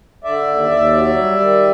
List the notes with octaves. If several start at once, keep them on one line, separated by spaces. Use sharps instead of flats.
D3 D5 E5
D#2
D#2
F#3
G3
D#3